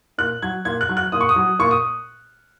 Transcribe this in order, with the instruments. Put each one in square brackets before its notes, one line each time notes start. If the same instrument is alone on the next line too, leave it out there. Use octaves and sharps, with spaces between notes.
[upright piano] A#2 F#6
F#3 G#6
A#2 G#6
F#6
F#3
F#6
A#2 D#6
C#6
D#6
F#3
A#2 C#6
D#6